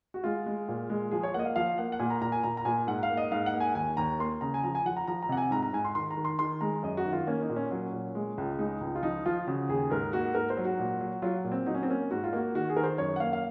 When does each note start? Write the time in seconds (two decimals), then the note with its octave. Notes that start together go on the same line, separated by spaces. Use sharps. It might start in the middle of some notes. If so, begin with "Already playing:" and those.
0.14 F#4
0.24 G#3 F4
0.46 G#3
0.68 A#2
0.90 G#3
1.11 F3 G#4
1.23 C#5
1.34 A#3 D#5 F#5
1.45 F5
1.56 F3 F5
1.78 A#3 F#5
1.92 F#5
1.99 A#2 G#5
2.10 A#5
2.22 A#2 A#5
2.32 G#5
2.43 A#2 A#5
2.57 A#5
2.65 A#2 G#5
2.87 G#2 F#5
3.03 F5
3.10 A#3
3.17 D#5
3.31 G#2 F5
3.46 F#5
3.54 A#3
3.60 G#5
3.75 D#2 G#5
3.97 D#2 A#5
4.19 A#3 C6
4.41 C#3 A#5
4.54 G#5
4.64 F3 A#5
4.75 G#5
4.86 F3 F#5
4.97 A#5
5.08 F3 A#5
5.23 A#5
5.29 C3 F#5
5.37 G#5
5.51 G#2 A#5
5.62 A#5
5.73 G#2 G#5
5.85 C6
5.95 D#3 C6
6.11 A#5
6.17 D#3
6.25 C6
6.39 D#3 C6
6.61 G#3 A#5
6.83 F#2 D#5
6.97 F#4
7.06 D#3
7.13 F4
7.27 A#3 C#4
7.41 D#4
7.49 A#2
7.56 C#4
7.71 F#3 C#4
7.93 A#2
8.15 G#3
8.38 C#2
8.59 G#3 D#4
8.81 C#2
8.95 F4
9.02 F3 D#4
9.26 F3 F4
9.47 C#3 F#4
9.69 D#2 G#4
9.90 G#2 A#4
10.13 A#3 F#4
10.35 G#2 A#4
10.50 C5
10.57 F#3
10.65 F#4
10.79 A#2
11.01 F#3
11.22 F#3 F4
11.44 A#2
11.52 C4
11.66 F#3 D#4
11.75 C#4
11.83 C4
11.88 A#3 C#4
12.11 G#2 F#4
12.24 F4
12.33 A#3 F#4
12.55 D#3 F#4
12.70 G#4
12.77 D#3 A#4
12.83 C5
12.98 F#2 C#5
13.16 F#5
13.20 A#3 F5
13.33 F5